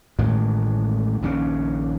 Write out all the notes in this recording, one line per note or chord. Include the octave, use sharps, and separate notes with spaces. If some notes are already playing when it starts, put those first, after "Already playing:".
A1 A2 D#3 G#3
A#1 D#2 C#3 C#4